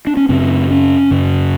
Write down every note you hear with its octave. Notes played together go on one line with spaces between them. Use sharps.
D4
C#4
F#2 C#3 C4
C#4
F#2 C#3